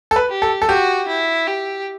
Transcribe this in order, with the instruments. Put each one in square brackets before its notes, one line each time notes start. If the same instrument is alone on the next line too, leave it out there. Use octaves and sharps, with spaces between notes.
[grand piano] A4
B4
[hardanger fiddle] G4
[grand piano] A4
A4
[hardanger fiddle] F#4 [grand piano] G4
[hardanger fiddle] E4
G4